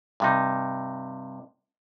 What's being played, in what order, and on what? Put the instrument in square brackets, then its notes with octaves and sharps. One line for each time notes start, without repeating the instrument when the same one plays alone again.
[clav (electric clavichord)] G2 C3 D#4